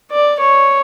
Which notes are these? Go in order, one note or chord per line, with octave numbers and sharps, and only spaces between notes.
D5
C#5